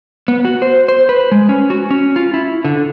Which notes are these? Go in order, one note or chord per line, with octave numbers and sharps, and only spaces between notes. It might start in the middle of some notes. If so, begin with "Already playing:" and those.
B3
F#4
C5
C5
B4
G#3
C#4
F#4
C#4
F4
E4
D3